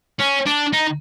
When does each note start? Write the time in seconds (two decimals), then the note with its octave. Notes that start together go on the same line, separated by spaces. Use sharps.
0.20 C#4
0.46 D4
0.73 D#4